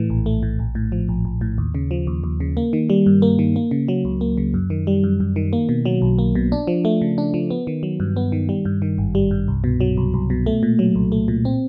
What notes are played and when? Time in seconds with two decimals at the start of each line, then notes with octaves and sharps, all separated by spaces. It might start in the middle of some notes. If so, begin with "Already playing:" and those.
Already playing: A2 E3 A3
0.10 A#1
0.26 A3
0.43 A2
0.59 A#1
0.75 A2
0.92 F3
1.09 A#1
1.25 A#1
1.41 A2
1.58 D#2
1.75 C#3
1.91 F3
2.07 D#2
2.24 D#2
2.40 C#3
2.57 A#3
2.73 D#3
2.90 G3
3.06 G2
3.22 A#3
3.39 D#3
3.56 A#3
3.71 C#3
3.88 F#3
4.05 C#2
4.21 A#3
4.37 C#3
4.54 F#2
4.70 D#3
4.87 G3
5.04 F#2
5.20 F#2
5.36 D#3
5.53 A#3
5.69 B2
5.85 F#3
6.02 B1
6.18 A#3
6.35 B2
6.52 D4
6.67 F3
6.85 A3
7.02 C#3
7.18 D4
7.34 F3
7.51 B3
7.67 D#3
7.83 F#3
8.00 G2
8.17 B3
8.32 D#3
8.49 G3
8.65 G2
8.82 D#3
8.98 G#1
9.15 G3
9.31 G2
9.48 C2
9.64 B2
9.81 F#3
9.97 C2
10.14 C2
10.30 B2
10.46 A3
10.63 A#2
10.79 F#3
10.95 C2
11.12 A3
11.28 A#2
11.45 C4